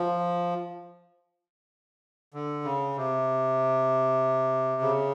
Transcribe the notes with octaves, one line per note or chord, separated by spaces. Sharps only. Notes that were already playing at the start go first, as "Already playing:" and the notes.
Already playing: F3
D3
C#3
C3
C#3